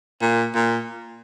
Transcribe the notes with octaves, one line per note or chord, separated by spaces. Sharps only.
A#2
A#2